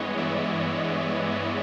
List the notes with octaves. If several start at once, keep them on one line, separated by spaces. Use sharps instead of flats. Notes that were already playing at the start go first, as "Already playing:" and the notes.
Already playing: G2 E3 G#3 B3 C#5 D#5
D5 E5